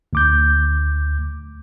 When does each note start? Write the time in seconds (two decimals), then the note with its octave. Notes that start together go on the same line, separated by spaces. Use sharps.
0.13 D2 D6 G6